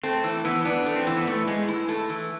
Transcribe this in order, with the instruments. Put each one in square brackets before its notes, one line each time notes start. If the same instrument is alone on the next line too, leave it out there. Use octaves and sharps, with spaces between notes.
[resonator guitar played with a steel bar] A3 [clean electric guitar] C4
[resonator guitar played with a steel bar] E3
[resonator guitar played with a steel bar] E3 [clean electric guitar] B3
[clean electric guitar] B3 [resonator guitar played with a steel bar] D4
[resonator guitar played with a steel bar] A3
[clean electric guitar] C4
[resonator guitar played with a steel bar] E3
[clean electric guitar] B3
[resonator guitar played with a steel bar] E3 [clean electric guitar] A3
[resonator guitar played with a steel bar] A2 [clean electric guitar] G#3
[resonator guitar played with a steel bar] E4
A3
E3